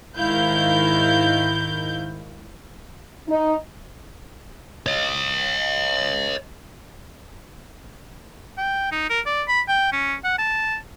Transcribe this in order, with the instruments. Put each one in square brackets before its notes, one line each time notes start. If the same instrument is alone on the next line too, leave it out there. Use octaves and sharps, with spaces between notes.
[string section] G#2 D#3 E4 F5 G6
[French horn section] D#4
[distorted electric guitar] C#5 D#5
[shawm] G5
D#4
A#4
D5
B5
G5
C#4
F#5
A5